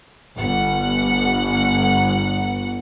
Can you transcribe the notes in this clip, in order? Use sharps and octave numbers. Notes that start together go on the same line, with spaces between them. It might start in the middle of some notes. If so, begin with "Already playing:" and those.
G1 F#5